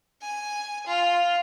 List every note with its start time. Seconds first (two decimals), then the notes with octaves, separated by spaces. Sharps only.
0.21 G#5
0.87 F4